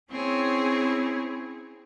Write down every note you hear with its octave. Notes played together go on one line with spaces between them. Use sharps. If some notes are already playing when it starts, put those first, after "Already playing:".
C4 C#4 E4 G#4 C#5